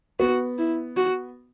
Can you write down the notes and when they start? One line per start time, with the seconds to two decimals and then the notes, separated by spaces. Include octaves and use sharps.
0.20 B3 F#4
0.58 E4
0.97 F#4